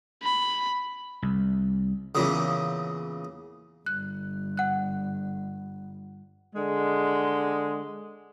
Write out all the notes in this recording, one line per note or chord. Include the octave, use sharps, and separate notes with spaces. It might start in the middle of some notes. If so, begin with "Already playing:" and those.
B5
C2
E2 A#2 C#3
G1 F#6
F#5 F#6
D3 G#3